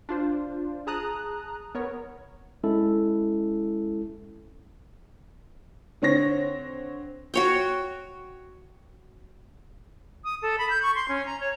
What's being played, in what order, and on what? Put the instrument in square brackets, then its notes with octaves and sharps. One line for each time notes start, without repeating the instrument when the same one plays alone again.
[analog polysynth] D4 F4 C5
G#4 A5 A#5 D#6 F#6
B3 A#4 C#5
[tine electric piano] G#3 C#4 E4 A4
[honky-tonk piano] D3 C4 C#5 A#6
[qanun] F#4 C#5 G5
[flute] D#6
A4
B5
G6
C#6
C6
C#4
A#5
C#5